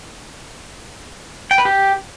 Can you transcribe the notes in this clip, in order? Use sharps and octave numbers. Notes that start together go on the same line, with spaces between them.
G5
B4
G4